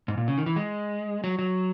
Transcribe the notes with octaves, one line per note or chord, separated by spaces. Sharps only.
G#2
A#2
C#3
D#3
E3
G#3
F#3
F#3